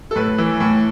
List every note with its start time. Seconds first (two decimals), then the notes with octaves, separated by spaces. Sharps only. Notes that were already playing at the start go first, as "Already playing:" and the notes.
0.11 A4
0.15 A2 B4
0.38 E3
0.60 A2